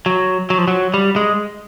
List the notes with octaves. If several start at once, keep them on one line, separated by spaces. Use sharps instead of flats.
F#3
F#3
F3
F#3
G3
G#3